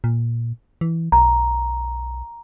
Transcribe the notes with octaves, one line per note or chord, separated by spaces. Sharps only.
A#2
E3
B1 A#5